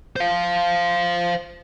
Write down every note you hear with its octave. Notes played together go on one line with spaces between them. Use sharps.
C5 F5